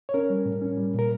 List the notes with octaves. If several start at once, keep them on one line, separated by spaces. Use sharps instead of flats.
C#5
C#4 A#4
G3
A2
C#4
G3
A#2 A#4